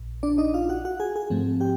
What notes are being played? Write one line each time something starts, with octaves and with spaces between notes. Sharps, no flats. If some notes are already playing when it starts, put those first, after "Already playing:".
Already playing: A#1 A#2
D4 D5
D#4 D#5
F4 F5
F#4 F#5
F#4 F#5
G#4 G#5
G#4 G#5
G#2 F3 A3 C4
G4 G5